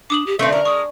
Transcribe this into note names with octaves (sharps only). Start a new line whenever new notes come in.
D4 D6 D#6 F#7
G4
F#2 A2 D3 A3 C4 E5
A#4
G#3 C#6 D#6